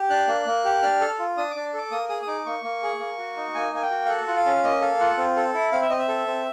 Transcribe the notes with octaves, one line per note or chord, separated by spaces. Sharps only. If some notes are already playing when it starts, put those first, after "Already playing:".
Already playing: G4
D4 F#6
A#3
A#3
G4
D4 F6
A4
F4
D4 D#6
D4 D6
A4 D6
A#3 D#6
G#4 D#6
D#6
D#4 D6
A#3 C#6
A#3
G#4
A#3
F#4
D#4
A#3 G#5
A#3 G#5
G5
F#4
F5
A4 F#5
F4 F#5
F5
C#4
A#3 D#5
A4 F5
F4 F#5
C4
A4
E4
C4 F5
E5
C4 D#5
E5
A4
C4